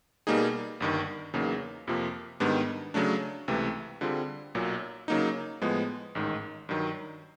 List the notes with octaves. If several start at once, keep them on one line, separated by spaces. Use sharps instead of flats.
B2 G3 A#3 D#4 G#4
G1 G2 D#3
E2 C#3 F#3 A#3 D#4
F2 C3 F3 A#3
G#2 D#3 G3 B3 D4
C#3 F#3 A3 D4
C#2 C3 E3 A3
D3 G3 C4 F4 G#4
B1 A#2 F#3
C#3 F#3 A#3 D#4
A2 F3 G#3 B3
A1 G#2 D#3
G2 D#3 F#3